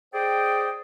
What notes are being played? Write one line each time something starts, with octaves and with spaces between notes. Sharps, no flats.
G#4 C5 D5 D#5 G5